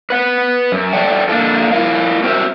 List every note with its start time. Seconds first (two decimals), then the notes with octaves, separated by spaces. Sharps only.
0.10 B4 F#5
0.72 F#2
0.93 A4 D5 E5 F#5 G5 A5
1.29 D3 A#3 D4 F4 A4
1.72 E4 F4 A#4 F5
2.24 C4 F#4 A#4 C5 D#5 E5